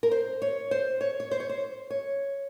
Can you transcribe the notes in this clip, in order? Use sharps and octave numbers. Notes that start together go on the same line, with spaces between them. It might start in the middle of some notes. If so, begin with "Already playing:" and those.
A#4
C5
C#5
C5
C#5
C#5
C5
C#5
C5
C#5